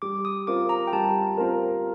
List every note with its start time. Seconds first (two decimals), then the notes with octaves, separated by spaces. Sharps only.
0.02 G3 D6
0.25 D#6
0.47 C4 F4 A#4 D6
0.69 A#5
0.87 G5
0.93 G3 A5
1.37 C4 F4 A#4